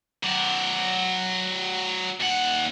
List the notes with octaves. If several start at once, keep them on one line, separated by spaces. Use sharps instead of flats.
F#3 D5
D#2 F#5